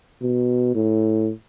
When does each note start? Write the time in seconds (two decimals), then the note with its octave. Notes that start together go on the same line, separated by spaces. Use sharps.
0.22 B2
0.75 A2